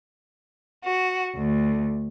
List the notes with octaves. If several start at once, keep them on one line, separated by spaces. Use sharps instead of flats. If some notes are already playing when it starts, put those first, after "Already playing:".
F#4
D2